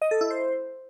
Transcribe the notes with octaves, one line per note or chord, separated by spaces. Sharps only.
D#5
A4
E4
C5